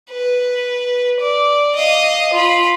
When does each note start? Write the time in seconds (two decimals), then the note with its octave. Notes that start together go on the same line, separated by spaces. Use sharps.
0.10 B4
1.21 D5
1.75 D#5 F5
2.33 F4 B5